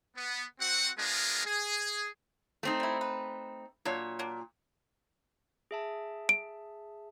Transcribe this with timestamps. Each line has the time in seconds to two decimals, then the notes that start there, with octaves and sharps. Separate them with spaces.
0.17 B3
0.61 C4 F#4 F#5
0.98 G#3 B3 D4 F4 G#4 A#4
1.46 G#4
2.63 A3 C4 D#4
2.80 G3 E4
3.01 B4
3.85 A#2 F#3 D4 C#5
4.19 F#3 A#3 D4
5.71 G#4 E5 A5
6.29 D7